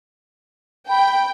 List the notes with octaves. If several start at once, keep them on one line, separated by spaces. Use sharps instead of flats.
G5 B5